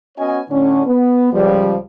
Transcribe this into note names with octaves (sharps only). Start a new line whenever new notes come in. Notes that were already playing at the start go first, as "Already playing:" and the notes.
B3 C#4 F#4 C#5 D#5 G#5
A2 D3 C#4
B3
C#2 F3 G3